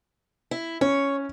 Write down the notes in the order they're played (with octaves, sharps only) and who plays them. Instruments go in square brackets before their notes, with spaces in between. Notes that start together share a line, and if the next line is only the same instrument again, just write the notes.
[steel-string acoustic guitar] E4
[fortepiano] C#4 [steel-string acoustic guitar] C#5